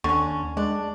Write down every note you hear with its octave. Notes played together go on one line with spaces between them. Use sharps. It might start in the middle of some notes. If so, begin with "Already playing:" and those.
D#2 D3 C#4 C#6
G#3 D4